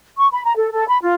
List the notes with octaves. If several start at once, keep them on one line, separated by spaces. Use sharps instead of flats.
C#6
B5
A#5
A4
A4
B5
F4